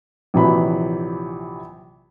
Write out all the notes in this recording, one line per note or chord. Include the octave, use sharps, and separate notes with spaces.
A#1 C3 E3 F#3 B5